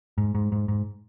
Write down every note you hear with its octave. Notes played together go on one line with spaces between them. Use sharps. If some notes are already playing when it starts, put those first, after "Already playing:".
G#2
G#2
G#2
G#2